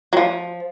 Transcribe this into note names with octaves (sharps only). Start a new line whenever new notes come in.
F#3
F3